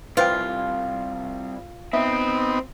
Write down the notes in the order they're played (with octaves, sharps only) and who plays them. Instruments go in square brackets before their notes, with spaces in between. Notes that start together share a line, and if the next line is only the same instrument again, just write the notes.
[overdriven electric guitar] C2 [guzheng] F4 [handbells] B4 C5 G5
[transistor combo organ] B3 D#4 [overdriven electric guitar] C4 [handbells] E5